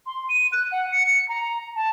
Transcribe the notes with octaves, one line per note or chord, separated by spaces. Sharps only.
C6
D#7
F#6
F#5
C#7
C#7
A#5
A5